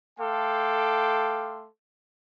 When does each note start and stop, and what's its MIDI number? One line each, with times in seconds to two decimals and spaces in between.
0.19 1.66 57
0.19 1.66 69
0.19 1.66 77
0.19 1.66 79
0.19 1.66 84
0.19 1.66 86